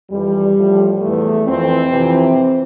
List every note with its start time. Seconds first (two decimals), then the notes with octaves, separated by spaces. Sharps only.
0.11 F2 E3 G3
0.56 A2 F3
1.01 E2 E3 A3
1.46 F2 E3 C4
1.90 F2 C3 E3